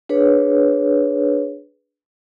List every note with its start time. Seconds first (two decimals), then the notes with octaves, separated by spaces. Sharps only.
0.09 D4 G#4 B4 C#5